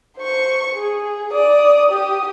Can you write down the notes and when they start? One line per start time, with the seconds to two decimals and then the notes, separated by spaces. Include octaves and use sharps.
0.18 C5 C#6
0.74 G#4
1.33 D5 D#6
1.92 G4 D#6